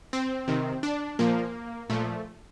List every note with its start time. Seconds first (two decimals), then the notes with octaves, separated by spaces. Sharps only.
0.13 C4
0.48 C3 D#3
0.83 D4
1.19 A#2 F3 A#3
1.90 A#2 F3 A3